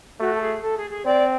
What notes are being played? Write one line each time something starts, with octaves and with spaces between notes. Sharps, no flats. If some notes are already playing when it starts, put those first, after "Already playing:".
A3 F#4
A4
G#4
A4
G#4
G#4
C4 D5